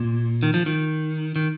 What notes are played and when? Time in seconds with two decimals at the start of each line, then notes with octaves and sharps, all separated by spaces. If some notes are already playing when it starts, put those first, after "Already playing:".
Already playing: A#2
0.43 D#3
0.54 F3
0.66 D#3
1.36 D#3